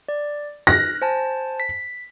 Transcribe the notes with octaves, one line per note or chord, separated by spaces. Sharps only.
D5
F6 F#6 A#6
C5 G#5 A5
B6